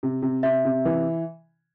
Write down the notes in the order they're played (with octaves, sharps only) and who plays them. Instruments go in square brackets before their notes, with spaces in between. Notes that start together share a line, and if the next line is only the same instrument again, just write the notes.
[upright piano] C3
C3
[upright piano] C3 [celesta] E5
[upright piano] C3
E3